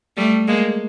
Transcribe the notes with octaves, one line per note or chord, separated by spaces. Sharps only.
G3 A3
G#3 A#3